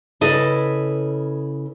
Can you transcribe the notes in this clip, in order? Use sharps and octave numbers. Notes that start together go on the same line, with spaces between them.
C#3 E4 A4 B4 D#5